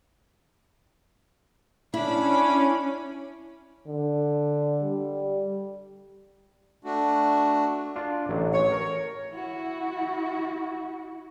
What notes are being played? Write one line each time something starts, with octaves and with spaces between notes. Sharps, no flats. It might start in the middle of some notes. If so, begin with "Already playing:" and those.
C#4 D4 E4 B5
D3
G3
A3 D4 F#4
D4 F4
A1 F#3
C#5
A#4
E4 F#4